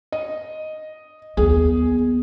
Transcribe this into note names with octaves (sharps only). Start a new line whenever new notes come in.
D#5
D#2 B3 G#4